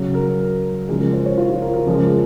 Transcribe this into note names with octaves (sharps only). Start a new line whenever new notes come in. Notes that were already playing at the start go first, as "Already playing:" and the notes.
Already playing: C#3 F#3
A#4
C#3 F3 G#3 G#4
A#4
C5
C#5
F4
F4
A#4
A#4
C#3 F3 G#3